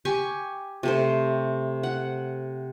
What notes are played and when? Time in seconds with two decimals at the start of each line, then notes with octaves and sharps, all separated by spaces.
0.05 G4 G#5 C#6
0.83 C3 A3 C5
1.83 F#5